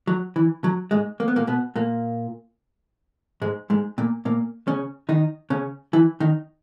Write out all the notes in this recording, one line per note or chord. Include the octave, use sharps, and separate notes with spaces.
F#3
E3
F#3
G#2 G#3
A#3
B3
A#2 A#3
B2 B3
A#2 A#3
G#2 G#3
G#2 G#3
A#2 A#3
A#2 A#3
C#3 C#4
D#3 D#4
C#3 C#4
E3 E4
D#3 D#4